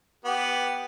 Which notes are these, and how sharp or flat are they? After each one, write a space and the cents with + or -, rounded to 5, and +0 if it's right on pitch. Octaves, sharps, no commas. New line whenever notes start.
B3 +0 G4 +0